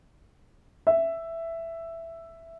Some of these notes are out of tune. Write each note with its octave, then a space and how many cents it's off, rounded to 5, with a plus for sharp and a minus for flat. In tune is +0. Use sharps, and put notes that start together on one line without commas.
E5 +5